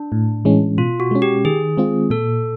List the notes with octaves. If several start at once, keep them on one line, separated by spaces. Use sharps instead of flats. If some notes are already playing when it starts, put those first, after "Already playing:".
Already playing: D4
A2
E3 G#3 C#4
B2 F4
F#4
G#3 C#4
G4
D#3 G#4
G#3 C4 F4
A#2 A4